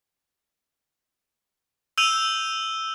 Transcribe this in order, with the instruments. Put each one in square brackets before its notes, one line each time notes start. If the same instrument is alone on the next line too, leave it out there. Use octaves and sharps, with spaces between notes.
[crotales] E6 G6 D#7 F7 G7